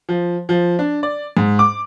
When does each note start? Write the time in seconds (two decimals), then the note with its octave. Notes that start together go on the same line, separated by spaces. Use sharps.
0.09 F3
0.49 F3
0.79 D4
1.03 D5
1.37 G#2
1.59 D6